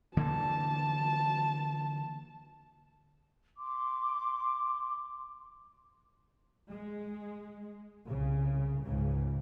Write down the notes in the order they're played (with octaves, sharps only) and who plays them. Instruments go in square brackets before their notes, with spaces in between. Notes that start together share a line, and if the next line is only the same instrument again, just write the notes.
[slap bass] D3 E3 A#3 [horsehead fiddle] A5
[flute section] C6 D6
[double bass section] G#3
C2 C#3
C#2 G#2 C#3